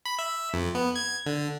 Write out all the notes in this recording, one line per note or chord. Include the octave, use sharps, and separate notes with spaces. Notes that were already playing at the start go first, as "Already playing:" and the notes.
B5
E5
F2
B3
G#6
D3